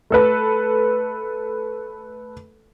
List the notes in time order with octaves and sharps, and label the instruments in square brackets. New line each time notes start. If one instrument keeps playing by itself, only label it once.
[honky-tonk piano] A3 A4 B4